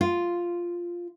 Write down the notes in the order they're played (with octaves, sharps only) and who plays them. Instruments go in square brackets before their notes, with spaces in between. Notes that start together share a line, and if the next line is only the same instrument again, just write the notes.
[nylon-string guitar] F4